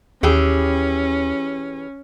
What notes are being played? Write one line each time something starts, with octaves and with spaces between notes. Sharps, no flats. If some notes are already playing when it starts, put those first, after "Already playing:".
D#2 E3 C#4 G4 G#4